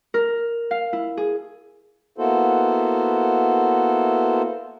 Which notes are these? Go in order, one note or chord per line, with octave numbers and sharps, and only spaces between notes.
A#4
F5
E4
G#4
A#3 B3 E4 F#4 A4 C5